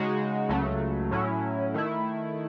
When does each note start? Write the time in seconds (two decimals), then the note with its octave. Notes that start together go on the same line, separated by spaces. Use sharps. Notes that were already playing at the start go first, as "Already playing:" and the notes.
Already playing: C#3 G#3 D#4 F#4
0.49 C#2 C#3 F#3 A3
1.11 A2 F#3 C#4 E4
1.74 D#3 A3 E4